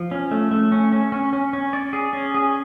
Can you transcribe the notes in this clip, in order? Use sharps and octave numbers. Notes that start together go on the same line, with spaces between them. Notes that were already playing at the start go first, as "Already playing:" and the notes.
Already playing: F3
C#4
A3
A3
C#4
C#4
C#4
C#4
C#4
D5
G#4
C#4
G#4